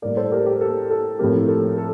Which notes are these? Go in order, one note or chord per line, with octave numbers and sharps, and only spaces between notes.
A2 G3 A#3 A#4 D5
A4 C5
G4 A#4
G4
A4
A4
A2 F3 A3 C4 G4 A#4
A4
A4